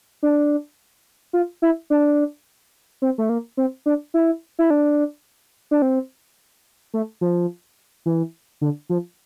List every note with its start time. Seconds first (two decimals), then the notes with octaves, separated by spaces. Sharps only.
0.23 D4
1.33 F4
1.62 E4
1.90 D4
3.02 C4
3.18 A3
3.29 A#3
3.57 C4
3.86 D4
4.14 E4
4.59 E4
4.70 D4
5.71 D4
5.82 C4
6.94 A3
7.21 F3
8.06 E3
8.61 D3
8.89 F3